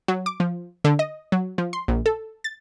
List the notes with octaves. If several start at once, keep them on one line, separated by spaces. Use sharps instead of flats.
F#3
D6
F3
D3
D#5
F#3
F3
C6
A#1
A4
A6